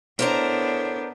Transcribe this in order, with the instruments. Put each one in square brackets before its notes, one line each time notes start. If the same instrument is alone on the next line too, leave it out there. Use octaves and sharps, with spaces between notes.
[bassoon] A2 [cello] B3 D4 [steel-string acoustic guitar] A#4 C5 A#5